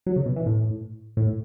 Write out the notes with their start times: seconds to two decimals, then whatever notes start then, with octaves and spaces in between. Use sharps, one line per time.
0.06 F#3
0.16 C#3
0.26 B2
0.36 E3
0.46 A2
1.17 A2